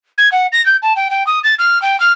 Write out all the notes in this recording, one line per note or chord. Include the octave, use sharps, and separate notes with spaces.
G#6
F#5
A#6
G6
A5
G5
G5
D#6
A6
F6
G5
F6